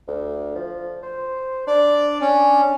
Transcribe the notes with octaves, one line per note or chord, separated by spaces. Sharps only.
D2
F3
C5
D4 D5
C#4